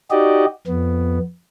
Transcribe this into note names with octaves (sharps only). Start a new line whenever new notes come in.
D#4 F#4 G4 D5 D#5
F2 B3